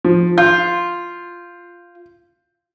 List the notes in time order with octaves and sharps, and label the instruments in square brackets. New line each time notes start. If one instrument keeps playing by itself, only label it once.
[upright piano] F3
[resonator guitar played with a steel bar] F4 [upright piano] G6